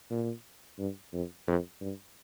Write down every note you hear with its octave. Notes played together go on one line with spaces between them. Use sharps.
A#2
G2
F2
F2
G2